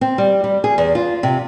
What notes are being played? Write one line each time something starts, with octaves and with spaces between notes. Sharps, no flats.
C4
G3
G3
G#4
E2
F4
C3